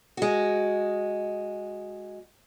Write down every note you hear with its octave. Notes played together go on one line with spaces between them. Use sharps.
G#3 F#4